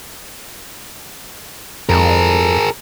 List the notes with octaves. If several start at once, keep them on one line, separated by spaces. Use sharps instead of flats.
F2 G#4 A#4